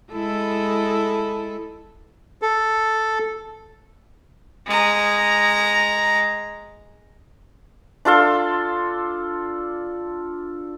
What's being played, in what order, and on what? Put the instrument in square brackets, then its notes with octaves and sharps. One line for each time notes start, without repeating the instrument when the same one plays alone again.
[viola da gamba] G#3 E4 A4
[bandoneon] A4
[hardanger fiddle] G#3 A#5
[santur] D4 F4 A4 C6